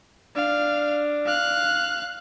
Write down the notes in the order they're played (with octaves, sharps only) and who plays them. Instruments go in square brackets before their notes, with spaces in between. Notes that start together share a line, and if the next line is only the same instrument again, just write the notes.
[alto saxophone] D4 [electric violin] F5
[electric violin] F5 F#6